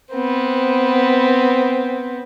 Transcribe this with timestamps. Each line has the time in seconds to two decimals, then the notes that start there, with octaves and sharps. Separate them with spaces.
0.12 B3 C4